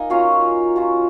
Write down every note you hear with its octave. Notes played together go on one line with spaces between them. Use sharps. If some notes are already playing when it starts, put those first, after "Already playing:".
Already playing: A#3 D#4 D#5 G#5
F#3 C#4 F4 C#5 F5
F#3 C#4 F4